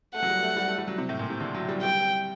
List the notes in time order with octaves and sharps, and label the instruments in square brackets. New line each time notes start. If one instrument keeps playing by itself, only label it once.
[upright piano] A3 [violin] F#5
[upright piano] F#3
G3
A3
G3
A3
G3
F#3
C3
A2
A#2
C3
D3
F#3
G3
[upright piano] G3 [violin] G5